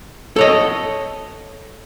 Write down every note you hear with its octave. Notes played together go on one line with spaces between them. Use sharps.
A4 C#5 D#5